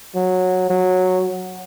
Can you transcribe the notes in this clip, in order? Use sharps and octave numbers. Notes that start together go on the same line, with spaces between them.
F#3
F#3